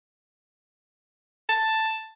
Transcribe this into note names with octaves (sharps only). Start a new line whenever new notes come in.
A5